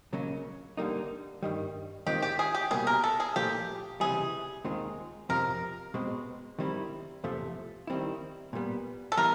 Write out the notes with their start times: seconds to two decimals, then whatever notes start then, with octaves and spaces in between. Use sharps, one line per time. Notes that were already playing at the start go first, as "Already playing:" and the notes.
0.13 C#2 C#3 F#3 A#3 C#4
0.77 D3 G3 A#3 D#4
1.43 G2 D#3 G3
2.06 D#2 D#3 G#3 C4 F4 G4
2.23 G4
2.39 G#4
2.54 G4
2.71 C2 B2 G3 A#3 G#4
2.87 A#4
3.04 A4
3.20 G#4
3.36 B1 A#2 F3 A3 G4
4.00 C#2 C3 E3 G3 G#4
4.65 D#2 D#3 G#3 C4 F4
5.29 F2 C3 F3 A#4
5.94 B2 G#3 C4
6.59 D#3 G3 C4 E4
7.24 E2 C3 F3 A3
7.87 D#3 G3 C4 E4
8.53 A#2 G3 B3
9.12 A4
9.17 A2 E3 G3 B3 A#4